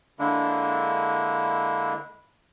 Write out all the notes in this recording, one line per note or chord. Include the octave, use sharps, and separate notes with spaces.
D3 G#3 A#3 D4 E4